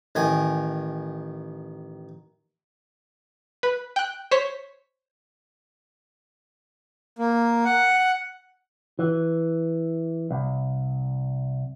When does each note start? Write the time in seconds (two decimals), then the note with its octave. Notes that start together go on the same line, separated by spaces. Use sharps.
0.15 A1 D#3 G#5
3.63 B4
3.96 G5 F#6
4.31 C5 C#5 B6
7.19 A#3
7.65 F#5
8.99 E3
10.31 C2